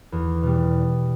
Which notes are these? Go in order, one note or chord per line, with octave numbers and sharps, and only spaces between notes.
E2
B2 G3